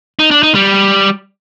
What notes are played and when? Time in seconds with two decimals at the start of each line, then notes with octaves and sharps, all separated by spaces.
0.19 D#4
0.31 D4
0.43 D#4
0.55 G3